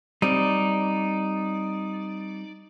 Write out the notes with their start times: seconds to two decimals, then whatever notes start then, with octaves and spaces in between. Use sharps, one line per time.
0.22 G3 C4 D#4 D5